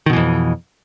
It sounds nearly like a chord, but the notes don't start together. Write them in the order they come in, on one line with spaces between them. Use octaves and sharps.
D#3 B2 E3 F2